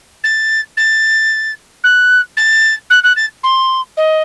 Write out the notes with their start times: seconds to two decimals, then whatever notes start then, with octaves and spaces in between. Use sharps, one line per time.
0.24 A6
0.77 A6
1.84 F#6
2.37 A6
2.90 F#6
3.04 F#6
3.16 A6
3.44 C6
3.97 D#5